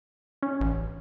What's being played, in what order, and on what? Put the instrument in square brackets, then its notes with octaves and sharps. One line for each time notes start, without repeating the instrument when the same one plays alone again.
[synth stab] C#4
[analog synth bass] A1